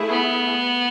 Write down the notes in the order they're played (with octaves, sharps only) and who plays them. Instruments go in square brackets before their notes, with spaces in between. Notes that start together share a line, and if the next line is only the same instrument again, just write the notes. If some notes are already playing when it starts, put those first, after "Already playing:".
Already playing: [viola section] A3 E4 G#4
[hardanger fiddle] B3